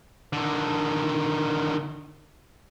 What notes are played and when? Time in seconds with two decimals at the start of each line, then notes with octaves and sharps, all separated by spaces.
0.33 D3 D#3